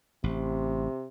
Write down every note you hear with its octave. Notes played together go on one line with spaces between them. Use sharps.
A1 C3